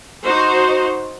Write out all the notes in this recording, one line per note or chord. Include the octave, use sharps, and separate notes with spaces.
D#4 F#4 C5